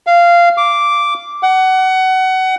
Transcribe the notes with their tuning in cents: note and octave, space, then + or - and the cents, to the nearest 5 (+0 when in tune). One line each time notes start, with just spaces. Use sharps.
F5 -15
D6 -5
F#5 +25